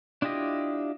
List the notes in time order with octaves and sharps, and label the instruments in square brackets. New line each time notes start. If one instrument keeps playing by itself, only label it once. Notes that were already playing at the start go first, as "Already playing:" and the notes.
[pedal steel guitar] D4 E4 F4 G4 D#5